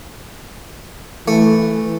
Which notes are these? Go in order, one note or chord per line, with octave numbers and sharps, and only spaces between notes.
E3 A3